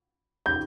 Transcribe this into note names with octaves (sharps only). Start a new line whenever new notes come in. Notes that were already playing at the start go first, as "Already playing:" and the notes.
G6